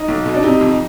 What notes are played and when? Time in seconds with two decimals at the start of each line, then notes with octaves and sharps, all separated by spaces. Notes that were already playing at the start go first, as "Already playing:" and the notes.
Already playing: D#4
0.08 B1
0.26 B2
0.34 D4
0.43 C3 D#4
0.61 F2